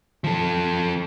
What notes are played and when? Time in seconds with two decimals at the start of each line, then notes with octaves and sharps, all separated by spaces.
0.24 F3 A4